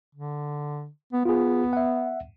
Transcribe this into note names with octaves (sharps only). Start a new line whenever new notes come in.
D3
B3
B3 F4 G#4
E5 F#5